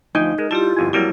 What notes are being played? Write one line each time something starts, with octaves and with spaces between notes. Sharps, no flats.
D2 F3 D#4 G5 G#5
G#3 A#4
G3 E4 F4 G4 A5
G1 F2 G#5
F2 F#3 G3 A#3 E4